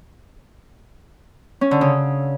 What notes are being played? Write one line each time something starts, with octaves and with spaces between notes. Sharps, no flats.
C#4
D3
C#3